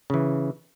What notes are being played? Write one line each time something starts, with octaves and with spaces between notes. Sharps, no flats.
C#3 E3